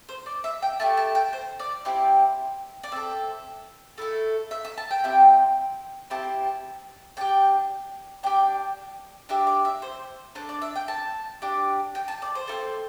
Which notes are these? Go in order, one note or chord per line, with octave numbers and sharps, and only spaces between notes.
C5
D5
E5
G5
A3 E4 G4 A5
A5
G5
C5
D5
C4 E4 G4 D5
D5
C4 A4 E5
A3 E4 A4
E5
E5
A5
G5
C4 E4 G4
C4 E4 G4 A5
D4 G4 G5
D4 G4 G5
D4 G4 E5
D5
E5
C5
D4 A4 C5
D5
E5
G5
A5
D4 G4
G5
A5
D5
C5
C4 E4 A4